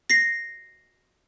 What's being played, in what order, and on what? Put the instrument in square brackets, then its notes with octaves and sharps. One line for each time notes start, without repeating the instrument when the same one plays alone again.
[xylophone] A#6 C7